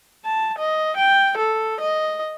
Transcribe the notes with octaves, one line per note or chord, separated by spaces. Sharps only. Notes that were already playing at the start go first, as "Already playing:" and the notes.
A5
D#5
G5
A4
D#5